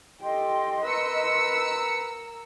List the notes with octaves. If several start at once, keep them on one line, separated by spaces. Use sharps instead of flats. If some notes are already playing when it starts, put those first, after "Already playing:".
G4 A4 D#5 G5 C6
A#4 B4 A#5 E6 C#7